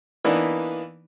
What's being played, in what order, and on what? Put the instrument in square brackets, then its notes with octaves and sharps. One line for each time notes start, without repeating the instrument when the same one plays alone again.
[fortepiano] E3 A#3 B3 D4 D#4